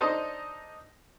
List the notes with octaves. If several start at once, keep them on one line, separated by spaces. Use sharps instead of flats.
D4 D#4 A4 C5 D#5